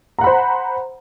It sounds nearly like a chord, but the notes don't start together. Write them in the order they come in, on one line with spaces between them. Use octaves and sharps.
A#5 F#5 B5 C5